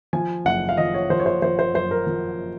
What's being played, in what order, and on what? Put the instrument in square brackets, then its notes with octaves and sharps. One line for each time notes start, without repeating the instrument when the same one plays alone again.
[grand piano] F3 G#5
F#1 F#5
F5
F3 D#5
C#5
F3 C5
C#5
C5
F3 C5
C5
F#2 C5
A#4
F3